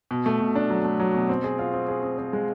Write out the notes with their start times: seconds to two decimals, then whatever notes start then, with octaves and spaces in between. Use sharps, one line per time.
0.11 B2
0.26 A3
0.40 B2
0.55 D4
0.70 F#3
0.84 A3
1.00 F#3
1.14 B2
1.29 C4
1.44 G#4
1.59 F4
1.74 C4
1.88 G#4
2.03 C4
2.18 C4
2.33 G#3